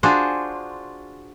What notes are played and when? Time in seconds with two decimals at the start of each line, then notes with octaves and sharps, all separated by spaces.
0.03 D4 F4 F#4 G#4 C5